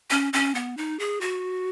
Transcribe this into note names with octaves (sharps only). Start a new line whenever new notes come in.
C#4
C#4
B3
D#4
G#4
F#4